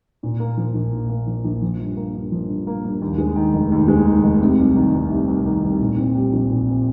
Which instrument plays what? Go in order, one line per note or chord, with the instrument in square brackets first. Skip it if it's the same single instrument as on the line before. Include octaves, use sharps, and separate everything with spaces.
[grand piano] A#2
A#3
F3
A#1
A#2
A#3
F3
A#1
F3
G2
A#3
G2
F3
G2
A#3
G2
D#2
G#3
D#3
F1
D#2
G#3
D#3
F1
C3
C2
D#3
C2
C3
C2
D#3
C2
A#2
C4
G3
A#1
A#2
C4